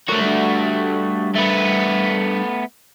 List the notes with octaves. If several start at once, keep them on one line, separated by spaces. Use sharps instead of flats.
A3 F#4 A4 A#4 C#5
G3 D4
A3 B3